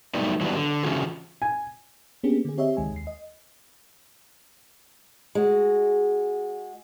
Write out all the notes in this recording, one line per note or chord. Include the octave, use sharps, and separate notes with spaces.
F#3 G3 A3 B3 D#4 D5
E3 F#3 G3 B3 D4
D3
C#3 E3 C#4 F4 F#4 G#4
G#5
A#3 B3 C#4 D4 G4 G#4
D3 G#4
C4 G4 C#5 D#5 E5
C#2 D#3 G#3 G#5
D#2 C7
D#5
G#3 F#4